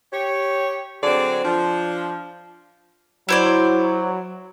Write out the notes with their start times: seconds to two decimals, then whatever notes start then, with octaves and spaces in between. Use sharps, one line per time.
0.13 G4 C#5
1.03 D3 F#3 C4 D4 G#4 D5
1.44 F3 D4
3.29 F#3 E4 C5 D5